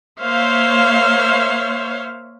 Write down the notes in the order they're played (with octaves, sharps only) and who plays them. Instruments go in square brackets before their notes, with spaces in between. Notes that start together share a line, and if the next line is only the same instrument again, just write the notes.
[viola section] A#3 C5 C#5 E5 F5